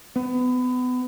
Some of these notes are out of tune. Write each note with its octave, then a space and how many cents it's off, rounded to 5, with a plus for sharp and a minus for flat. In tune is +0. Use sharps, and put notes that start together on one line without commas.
B3 +25